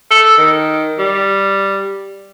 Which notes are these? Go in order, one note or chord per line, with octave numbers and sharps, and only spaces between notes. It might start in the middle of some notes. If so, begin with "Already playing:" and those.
A4
D#3
G3